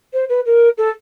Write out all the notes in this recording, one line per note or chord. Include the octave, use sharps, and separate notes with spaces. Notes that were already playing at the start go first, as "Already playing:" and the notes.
C5
B4
A#4
A4